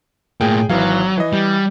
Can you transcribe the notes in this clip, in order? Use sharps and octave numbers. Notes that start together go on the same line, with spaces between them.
A2 A#3 G#4 G5
G#1 E3 F#3 F5
E3 D#5
G3